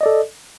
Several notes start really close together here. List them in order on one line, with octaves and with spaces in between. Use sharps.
D#5 D5 A4